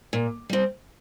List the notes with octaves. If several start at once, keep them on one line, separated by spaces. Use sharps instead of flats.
A#2
G3 C4